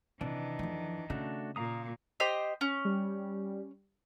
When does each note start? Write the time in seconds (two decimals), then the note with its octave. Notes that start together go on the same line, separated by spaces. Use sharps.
0.21 C3 D#3 E3 D4
0.59 F2 F3
1.10 C#3 A3 D4 F#4
1.56 A#2 F5 A#5 D#6
2.20 G4 C5 D#5
2.61 C#4
2.85 G3